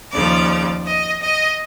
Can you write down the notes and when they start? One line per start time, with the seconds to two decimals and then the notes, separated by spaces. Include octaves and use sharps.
0.11 D#2 C#3 F3 D5
0.86 D#5
1.22 D#5